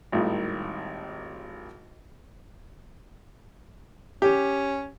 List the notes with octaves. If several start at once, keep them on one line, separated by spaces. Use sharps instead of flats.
G#1 A2 D#3 G3 A#3 F4
C#4 G4